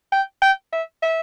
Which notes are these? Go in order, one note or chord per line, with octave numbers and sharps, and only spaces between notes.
G5
G5
E5
E5